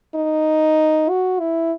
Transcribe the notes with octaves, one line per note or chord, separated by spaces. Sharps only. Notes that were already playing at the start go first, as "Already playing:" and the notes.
D#4
F#4
E4